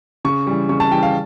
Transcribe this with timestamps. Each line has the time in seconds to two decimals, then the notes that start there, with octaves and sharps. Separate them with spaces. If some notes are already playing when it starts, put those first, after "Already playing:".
0.25 C#3 C#6
0.47 E3 G3
0.69 C#3 C#6
0.80 A5
0.91 E3 G3 G5
1.03 F5